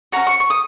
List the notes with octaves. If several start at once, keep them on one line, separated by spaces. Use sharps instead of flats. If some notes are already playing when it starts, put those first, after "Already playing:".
C#4 F#4 A#5
C#6
C#6
D#6